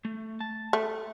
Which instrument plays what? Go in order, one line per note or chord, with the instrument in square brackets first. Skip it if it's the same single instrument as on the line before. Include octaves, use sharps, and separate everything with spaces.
[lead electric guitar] A3
A5
[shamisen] A3